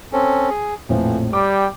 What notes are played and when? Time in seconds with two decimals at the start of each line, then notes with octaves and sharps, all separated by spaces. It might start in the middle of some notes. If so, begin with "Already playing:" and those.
0.13 C4 C#4 A4
0.49 G#4
0.89 A#1 F2 A2 E3 F3
1.33 G3 G5 D6